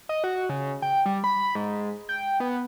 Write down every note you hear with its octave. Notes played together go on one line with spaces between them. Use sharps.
D#5
F#4
C#3
G5
G3
B5
G#2
G5
B3